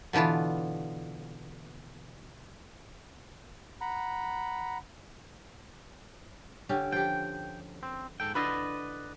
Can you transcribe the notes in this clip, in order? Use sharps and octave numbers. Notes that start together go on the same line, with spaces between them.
B2 D3 E3 B3 F4
F#5 A#5 B5
D3 C#4 G4
F3 G4 G5
C4
G#2 A4 G5
D3 E4 F4 B4 D5 D#5